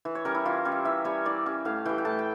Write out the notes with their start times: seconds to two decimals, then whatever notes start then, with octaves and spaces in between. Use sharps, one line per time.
0.05 E3
0.15 C#5
0.25 G3 C#4 A#4
0.35 E4
0.45 E3 F4
0.65 G3 C#4
0.72 E5
0.85 E3 E5
1.05 G3 C#4 C#5
1.25 E3 D5
1.46 G3 C#4
1.65 A2 F5
1.85 E3 G3 G5
1.98 G5
2.05 A2 A5
2.19 G5